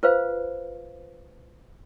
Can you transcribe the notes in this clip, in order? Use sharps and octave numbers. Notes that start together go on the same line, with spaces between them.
F4 B4 C5 F5